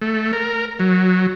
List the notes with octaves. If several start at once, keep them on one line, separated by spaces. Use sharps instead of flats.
A3
A#4
F#3